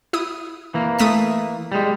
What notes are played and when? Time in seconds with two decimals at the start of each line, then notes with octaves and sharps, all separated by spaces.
0.13 E4 D#6
0.74 E3 A#3
0.99 A3 D#6 B6
1.72 G3 G#3